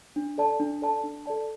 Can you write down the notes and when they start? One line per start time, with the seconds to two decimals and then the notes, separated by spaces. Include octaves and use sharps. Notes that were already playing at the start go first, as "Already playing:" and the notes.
0.16 D4
0.38 A4 D5 A5
0.60 D4
0.82 A4 D5 A5
1.04 D4
1.26 A4 D5 A5